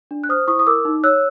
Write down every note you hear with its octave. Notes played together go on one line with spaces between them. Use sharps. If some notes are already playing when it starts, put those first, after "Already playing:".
D4
F#6
C5 D#6 F6
E4 C#6 D#6
D#6
A#4 D6 E6
D#4
C#5 E6 F#6